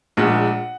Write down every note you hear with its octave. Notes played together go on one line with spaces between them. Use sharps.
A#1 A#2 G#3 F#5